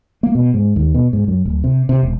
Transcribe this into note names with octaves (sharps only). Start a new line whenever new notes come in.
A#3
B2
G#2
D#2
B2
G#2
F#2
D1
C3
C3
E1